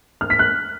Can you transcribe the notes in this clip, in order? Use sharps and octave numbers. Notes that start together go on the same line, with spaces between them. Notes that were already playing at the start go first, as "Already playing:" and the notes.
F6
B6
F#6